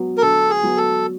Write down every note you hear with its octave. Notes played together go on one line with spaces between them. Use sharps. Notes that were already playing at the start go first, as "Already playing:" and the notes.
Already playing: F#3 B3
A#4
D3 A4
G#4
F#3 B3
A4